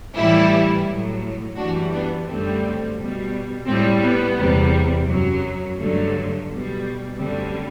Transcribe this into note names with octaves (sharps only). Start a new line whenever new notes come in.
A2 E3 G3 E4 G4
A2 F#3
F#2 E3 G3 D4 F#4
B3 D4
F#2 D3 G3 A3 C4
B2 G3
A2 G3 A3 C4
B3
E2 C3 G3
F#2 F#3
G2 D3 F#3 A3
B2 G3
F#2 D3 G3 A3 C4